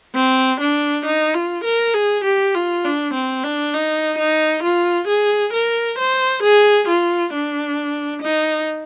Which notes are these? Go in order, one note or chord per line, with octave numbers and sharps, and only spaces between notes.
C4
D4
D#4
F4
A#4
G#4
G4
F4
D4
C4
D4
D#4
D#4
F4
G#4
A#4
C5
G#4
F4
D4
D#4